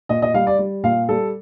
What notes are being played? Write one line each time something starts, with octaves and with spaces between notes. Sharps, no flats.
A#2 D#5
D#5
G3 F5
D5
G3
A#2 F5
G3 A4